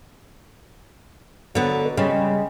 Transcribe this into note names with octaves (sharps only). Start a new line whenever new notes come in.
D3 F#3 B3
B2
C#3 G3 G#3